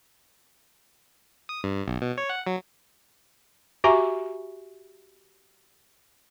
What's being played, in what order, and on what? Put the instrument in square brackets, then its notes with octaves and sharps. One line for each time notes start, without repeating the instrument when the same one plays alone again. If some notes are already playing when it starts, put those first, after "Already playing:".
[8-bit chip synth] D#6
G2
B1
B2
C#5
F#5
F#3
[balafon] F#4 G4 E5 G#5 A#5 C#6